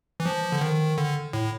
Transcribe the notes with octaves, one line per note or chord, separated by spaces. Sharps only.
E3
F3
D3
D#3
D3
A2